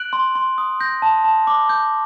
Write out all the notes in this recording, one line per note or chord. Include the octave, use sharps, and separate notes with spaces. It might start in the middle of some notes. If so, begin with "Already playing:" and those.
Already playing: F#6 D7 F#7
C6
C6
D#6
G6 A#6
A5
A5
D6
G6